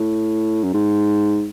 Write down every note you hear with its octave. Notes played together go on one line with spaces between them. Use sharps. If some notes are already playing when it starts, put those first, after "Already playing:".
Already playing: A2
F#2
G#2